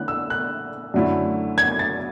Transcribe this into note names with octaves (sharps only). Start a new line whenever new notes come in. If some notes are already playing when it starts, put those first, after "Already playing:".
Already playing: D3 A3 C#4 E4 F#6
E6
F#6
F#2 D3 A3 E4
G#6
A6